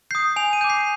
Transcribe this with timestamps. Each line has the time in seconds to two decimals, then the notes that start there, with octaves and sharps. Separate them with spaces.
0.11 D#6 G6 C7
0.36 G#5 F7
0.53 D#7
0.61 D6 G6
0.70 C7